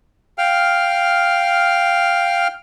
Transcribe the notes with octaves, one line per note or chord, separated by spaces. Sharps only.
F5 G5 F6